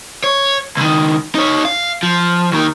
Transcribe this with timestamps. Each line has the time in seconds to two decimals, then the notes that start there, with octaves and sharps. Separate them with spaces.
0.24 C#5
0.77 C#2 D#3
1.35 D#4 C#5
1.65 F5
2.03 F3
2.51 D#2 D#3